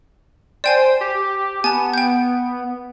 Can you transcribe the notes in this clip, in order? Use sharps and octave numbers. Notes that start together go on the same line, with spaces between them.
C5 D5 G5 G#5
G4
B3 G#5 A5
G5 G6